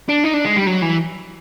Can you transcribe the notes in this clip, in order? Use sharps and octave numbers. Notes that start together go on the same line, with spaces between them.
D4
D#4
D4
G#3
G3
F#3
E3